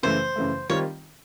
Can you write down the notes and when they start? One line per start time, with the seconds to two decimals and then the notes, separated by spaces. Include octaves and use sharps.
0.03 F#2 C#3 E3 A3 C5
0.36 F#2 C#3 E3 A3
0.69 D#3 G3 C4 F4 C#5